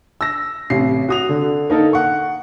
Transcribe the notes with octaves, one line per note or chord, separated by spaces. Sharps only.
E6 A#6
A1 C3 C7
F#4 D#6 F7
D3
A#3 D#4 A4 A#4
F#5 C#6